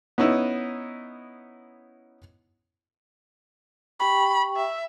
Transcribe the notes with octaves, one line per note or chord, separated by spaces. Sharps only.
B3 C#4 D#4 E4
G4 G5 B5 C#6
E5